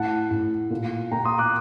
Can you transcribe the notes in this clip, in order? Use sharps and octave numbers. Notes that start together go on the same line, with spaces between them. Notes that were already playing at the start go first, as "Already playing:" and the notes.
Already playing: A2 F#5 A5
A2
A#2
A#2 G5 A#5
C6 D#6
D6 F#6